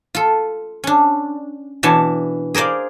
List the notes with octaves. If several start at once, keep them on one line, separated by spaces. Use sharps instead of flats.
F4 A4
C#4 D4
B2 E3 D4 C#5 A5
G#4 A#4 C5 D5 F5